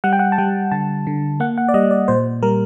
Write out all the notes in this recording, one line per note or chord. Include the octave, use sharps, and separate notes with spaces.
G3 F#5
G5
F#5
A5
G3 G5
D3 A5
D3
A#3 F#5
F#5
D5
G3 D#5
D5
A#2 C5
G3 A#4